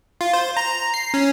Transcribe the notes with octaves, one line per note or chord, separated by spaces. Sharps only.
F4
C5
A#5
C7
C#4